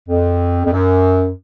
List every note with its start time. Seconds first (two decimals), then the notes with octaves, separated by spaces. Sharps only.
0.09 F2
0.64 F2
0.72 F#2